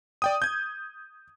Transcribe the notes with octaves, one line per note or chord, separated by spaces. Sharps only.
D5 G5 D#6
G6 G#6